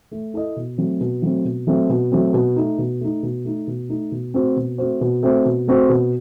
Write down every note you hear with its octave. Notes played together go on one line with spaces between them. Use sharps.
A3
E4 A4 D#5
B2
F#3 A3 C4
B2
F#3 A3 C4
B2
F#3 A3 C4
B2
F#3 A3 C4
B2
A3 D#4
B2
A3 D#4
B2
A3 D#4
B2
A3 D#4
B2
A3 C4 F#4 C5
B2
A3 C4 F#4 C5
B2
A3 C4 F#4 C5
B2
A3 C4 F#4 C5
B2